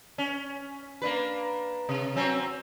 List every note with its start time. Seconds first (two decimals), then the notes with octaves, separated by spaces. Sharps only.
0.18 C#4
1.02 A#3 D4 B4
1.89 C3
2.16 F#3 C4 C#4